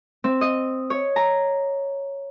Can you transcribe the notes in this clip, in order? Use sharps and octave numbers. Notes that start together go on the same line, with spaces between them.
C4
D#5
C#5
A#5